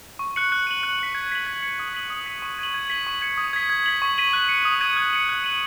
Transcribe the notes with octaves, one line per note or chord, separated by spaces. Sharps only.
C#6
F#6 C#7 F#7
F#6
D#7 F#7
F#6
B6 D#7
G#6
B6 F#7
G#6
C#7 F#7
D#6
B6 D#7 F#7
D#6
B6 D#7 F#7
C#6
G#6 D#7 F#7
G#6
B6 F#7
C#6
G#6 C#7
D#6
G#6 B6
G#6
B6 F#7
C#6
B6 D#7 F#7
F#6
C#7 F#7
D#6
G#6 D#7 F#7
F#6
C#7 F#7
F#6
D#7 F#7